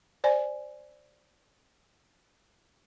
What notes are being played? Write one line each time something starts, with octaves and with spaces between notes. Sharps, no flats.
C5 D5 G#5